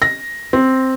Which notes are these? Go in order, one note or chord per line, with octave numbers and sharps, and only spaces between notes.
A#6
C4